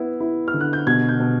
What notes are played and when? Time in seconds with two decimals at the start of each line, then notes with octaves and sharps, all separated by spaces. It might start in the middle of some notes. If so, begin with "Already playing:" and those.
Already playing: B3 E4
0.20 E4
0.48 F6
0.54 D3
0.61 F#6
0.73 G6
0.87 B2 G#6
1.09 G6
1.20 B2